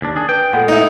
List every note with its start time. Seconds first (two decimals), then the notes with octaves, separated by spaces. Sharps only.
0.02 D#2 D4
0.16 D4 G#4
0.29 B4 G5
0.53 A#2 G#3 B3 A4 F#5
0.68 D#4 E4